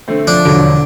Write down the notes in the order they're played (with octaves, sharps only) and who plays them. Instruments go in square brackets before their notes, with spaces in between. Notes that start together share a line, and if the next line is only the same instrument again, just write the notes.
[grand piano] D3 A3 C4
[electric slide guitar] F3 [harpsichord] D4
[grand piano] E1 F#3 D7 [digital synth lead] D3